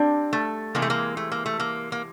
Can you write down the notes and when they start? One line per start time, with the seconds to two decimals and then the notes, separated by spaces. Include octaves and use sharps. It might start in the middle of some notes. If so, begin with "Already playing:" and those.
Already playing: G3 C4 D4
0.33 A3
0.75 C3 E3 G#3 A#3
0.82 A3
0.90 A#3
1.17 A3
1.32 A#3
1.46 A3
1.60 A#3
1.92 A#3